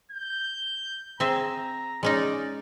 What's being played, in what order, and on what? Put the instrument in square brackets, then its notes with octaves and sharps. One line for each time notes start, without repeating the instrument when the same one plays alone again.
[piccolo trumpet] G6
[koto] C4 G#4 E5 [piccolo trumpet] A#5
[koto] G#3 C#4 D#4 [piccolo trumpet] D5